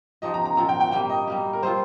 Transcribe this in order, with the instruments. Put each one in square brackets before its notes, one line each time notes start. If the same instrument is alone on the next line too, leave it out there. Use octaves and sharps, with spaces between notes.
[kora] F3 D#4 G4 [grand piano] D#5
[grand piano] A#5
A#5
[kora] A#2 F3 C4 [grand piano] A#5
[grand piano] G5
G5
[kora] G3 A#3 G4 [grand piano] G5
[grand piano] D#5
[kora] G3 A#3 G4
[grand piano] A#4
[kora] G3 C4 F4 [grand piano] C5